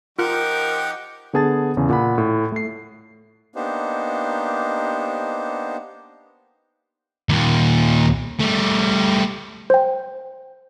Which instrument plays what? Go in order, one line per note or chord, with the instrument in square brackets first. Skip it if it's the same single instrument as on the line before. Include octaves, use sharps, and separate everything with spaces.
[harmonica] F3 D#4 G4 [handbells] F4 F#6 [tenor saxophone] A#4 [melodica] F#5
[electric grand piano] D3 B3 G#4 A5 A6
E2 C#3
A#2 F#5 B5
A2
A3 C7
[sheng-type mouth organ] A#3 B3 D4 D#4 G4 C5
[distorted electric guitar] D#2 A#2
G3 A3
[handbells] C5 G5